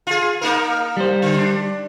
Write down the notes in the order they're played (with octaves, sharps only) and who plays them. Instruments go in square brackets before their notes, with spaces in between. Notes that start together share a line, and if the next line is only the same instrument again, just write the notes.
[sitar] F4 G#4
A#3 D#4 A#4
[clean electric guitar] G3 C5
[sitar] D3
D4